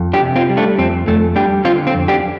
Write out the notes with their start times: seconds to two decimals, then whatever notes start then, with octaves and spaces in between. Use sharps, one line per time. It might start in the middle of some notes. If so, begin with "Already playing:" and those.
Already playing: F2
0.13 D4 G4
0.21 C3
0.36 C4 F4
0.49 G3
0.57 A3 D4
0.78 F2 C4
1.07 F2 A3
1.36 G3 D4 G4
1.65 D3 C4 F4
1.87 C4
1.95 F2
2.08 D4 G4